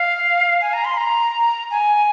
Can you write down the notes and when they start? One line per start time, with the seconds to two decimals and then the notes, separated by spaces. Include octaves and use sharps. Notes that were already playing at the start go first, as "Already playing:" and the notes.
Already playing: F5
0.61 G#5
0.73 A#5
0.85 C6
0.97 A#5
1.71 G#5